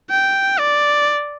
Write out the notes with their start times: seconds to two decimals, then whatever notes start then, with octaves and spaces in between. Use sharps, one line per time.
0.10 G5
0.59 D5